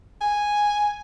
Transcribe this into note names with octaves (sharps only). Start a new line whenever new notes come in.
G#5